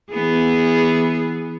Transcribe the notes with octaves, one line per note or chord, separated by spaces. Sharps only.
E3 B3 G#4